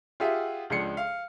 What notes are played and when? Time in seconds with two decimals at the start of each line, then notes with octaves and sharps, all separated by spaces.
0.20 F4 G4 G#4 E5 F#5
0.70 C#2 F3 G#3 D4 C7 C#7
0.97 F5